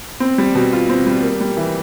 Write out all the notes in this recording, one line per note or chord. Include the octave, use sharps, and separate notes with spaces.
C4
G3
B2
F4
C4
G3
A#3
G3
E3